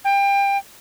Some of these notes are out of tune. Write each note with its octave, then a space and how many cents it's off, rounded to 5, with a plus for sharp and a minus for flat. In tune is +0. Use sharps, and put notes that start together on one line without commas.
G5 +25